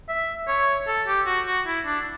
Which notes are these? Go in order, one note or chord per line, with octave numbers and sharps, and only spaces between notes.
E5
C#5
A4
G4
F#4
F#4
E4
D4